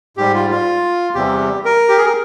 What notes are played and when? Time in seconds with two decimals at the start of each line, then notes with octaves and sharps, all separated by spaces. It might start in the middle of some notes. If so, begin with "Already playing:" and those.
0.17 G#2 G3 G4
0.34 F4
0.50 F4
1.15 E2 C3 E3 G3 G4
1.65 A#4
1.89 G4
1.98 G#4
2.05 A#4